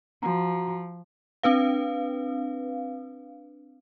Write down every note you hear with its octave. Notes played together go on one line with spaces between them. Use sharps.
F3 F#4 A#5
C4 D4 B4 F5